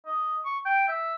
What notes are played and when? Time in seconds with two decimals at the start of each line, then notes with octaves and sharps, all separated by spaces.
0.06 D#5
0.45 C#6
0.65 G5
0.88 E5